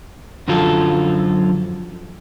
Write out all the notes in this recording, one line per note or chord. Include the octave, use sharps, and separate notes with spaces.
F#2 D3 F3 F#3 F4 A4